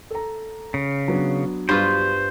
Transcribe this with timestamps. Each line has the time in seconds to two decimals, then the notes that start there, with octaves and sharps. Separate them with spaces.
0.11 A4 A#5
0.74 C#3
1.08 F#3 B3 D4
1.69 G2 F4 B4 C5